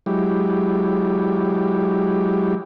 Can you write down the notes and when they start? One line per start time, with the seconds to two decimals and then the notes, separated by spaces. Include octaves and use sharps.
0.06 F#3 G#3 E4 G4